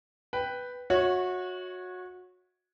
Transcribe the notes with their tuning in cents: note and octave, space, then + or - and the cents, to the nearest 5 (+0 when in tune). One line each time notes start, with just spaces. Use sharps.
B4 +0 G5 +0
F#4 -25 C#5 -5 E5 -35